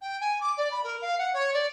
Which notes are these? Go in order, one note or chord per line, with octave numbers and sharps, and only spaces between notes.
G5
G#5
D6
D5
B5
A#4
F5
F#5
C#5
D5